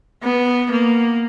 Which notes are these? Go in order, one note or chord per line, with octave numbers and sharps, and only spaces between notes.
B3
A#3